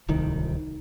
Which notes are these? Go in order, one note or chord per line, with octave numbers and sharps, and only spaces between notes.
D1 C2 D#3